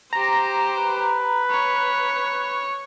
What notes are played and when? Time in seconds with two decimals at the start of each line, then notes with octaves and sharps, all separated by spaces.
0.13 G4 C5 A#5
0.78 B4
1.51 C#5